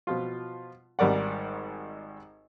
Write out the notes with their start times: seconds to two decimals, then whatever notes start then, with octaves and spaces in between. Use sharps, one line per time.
0.07 B2 F3 F4
0.99 G#1 G#2 G3 A#4 D5 F#5